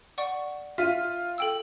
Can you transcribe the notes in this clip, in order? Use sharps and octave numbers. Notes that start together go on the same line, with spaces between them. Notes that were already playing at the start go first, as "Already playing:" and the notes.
D5 F#5 C#6
F4 E5 D#7
A4 G5 E6